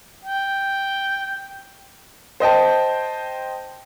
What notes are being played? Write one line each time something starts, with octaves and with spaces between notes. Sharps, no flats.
G5
C5 D#5 G5 A5